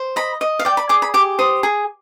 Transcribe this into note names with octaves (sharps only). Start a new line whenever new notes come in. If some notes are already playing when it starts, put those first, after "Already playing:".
Already playing: C5
D#5 B5
D#5
F5
D5 G5
B5
G#4 D6
B5
G4 D6
C5 D#6
G#4